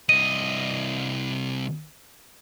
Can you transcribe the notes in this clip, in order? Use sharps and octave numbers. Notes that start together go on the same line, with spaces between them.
C2 D#5 D#7